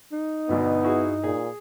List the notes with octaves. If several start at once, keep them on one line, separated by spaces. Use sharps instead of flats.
D#4
D2 G2 B2 D3 B3
E4 F#4 G#4
A#2 G#4